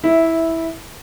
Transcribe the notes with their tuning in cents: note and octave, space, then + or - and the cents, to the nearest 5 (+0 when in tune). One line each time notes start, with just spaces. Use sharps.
E4 -10 E5 +0